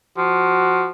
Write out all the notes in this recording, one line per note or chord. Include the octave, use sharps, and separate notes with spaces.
F3 F#4